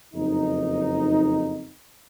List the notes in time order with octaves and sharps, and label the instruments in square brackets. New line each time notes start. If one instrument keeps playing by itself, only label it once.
[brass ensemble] F#1 F2 D#4